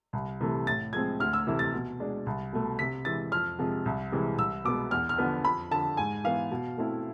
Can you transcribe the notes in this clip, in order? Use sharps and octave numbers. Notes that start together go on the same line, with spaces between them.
C2
C3 E3 A3
A2 A6
F3 G#3 C4 G#6
D2 F6
E6
C3 E3 A3 E4
A6
B2
G#3 D4
C2
B2 A3
C3 B6
E3 G#3 A6
F2 F6
C3 F3 G#3 C4
C2
C3 E3 G#3 C4
C2 E6
B2 G#3 B3 D6
E2 F6
F6
D3 F3 B3
F2 B5
D3 F3 A5
G#2 G#5
E3 B3 F5
B2
A3 C4 E4